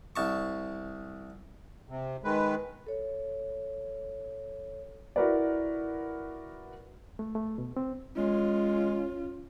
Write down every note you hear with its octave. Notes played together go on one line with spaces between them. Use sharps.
C2 A5 C#6
C3
D#3 G#3 B4
A4 C#5
E4 F#4 A#4 B4 D5
A3
A3
B2
C4
G#3 C#4 F4